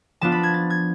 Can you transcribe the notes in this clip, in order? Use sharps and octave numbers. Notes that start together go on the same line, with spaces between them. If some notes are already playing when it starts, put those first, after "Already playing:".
F3 B3 D4 F4 A5
B5
G#6
A6
G#6